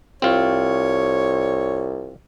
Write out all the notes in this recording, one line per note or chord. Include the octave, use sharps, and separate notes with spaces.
C2 C4 F4 C#5